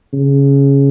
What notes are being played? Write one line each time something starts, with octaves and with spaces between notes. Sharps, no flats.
C#3